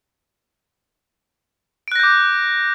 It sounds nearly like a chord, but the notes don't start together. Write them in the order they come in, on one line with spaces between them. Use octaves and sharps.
D7 F#6 A#6 G6 D6